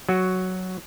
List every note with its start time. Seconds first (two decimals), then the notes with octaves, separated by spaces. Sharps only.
0.09 F#3 F#4